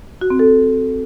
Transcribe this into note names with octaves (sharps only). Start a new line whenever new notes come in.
F#4
C4
A4